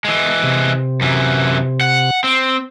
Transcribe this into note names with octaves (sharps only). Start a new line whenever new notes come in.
E3 G#3
C3
F#2 E3
F#5
C4